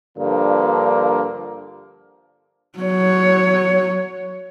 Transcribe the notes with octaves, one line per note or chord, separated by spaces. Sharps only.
G2 D3 F3 A#3
F#3 C#5